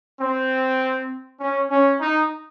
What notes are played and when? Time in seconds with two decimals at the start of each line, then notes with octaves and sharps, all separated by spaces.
0.21 C4
1.40 C#4
1.71 C#4
2.00 D#4